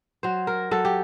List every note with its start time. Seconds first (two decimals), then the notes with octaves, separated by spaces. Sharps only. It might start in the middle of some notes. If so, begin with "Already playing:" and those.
0.23 F#3 C5
0.47 A#4
0.71 F#3 A4
0.85 G4